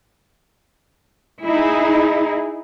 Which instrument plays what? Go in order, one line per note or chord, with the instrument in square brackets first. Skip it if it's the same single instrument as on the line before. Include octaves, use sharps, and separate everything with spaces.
[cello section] D#4 E4 G#4